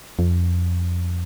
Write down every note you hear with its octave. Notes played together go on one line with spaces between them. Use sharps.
F2